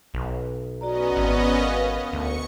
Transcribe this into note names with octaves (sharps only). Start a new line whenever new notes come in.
B1
B3 C#4 F#4 D5 D#5 A#5
G#1
A#4 F5
D2 C#6 C#7